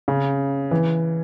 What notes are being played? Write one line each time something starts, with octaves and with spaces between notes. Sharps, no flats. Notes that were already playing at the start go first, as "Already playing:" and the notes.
C#3
E3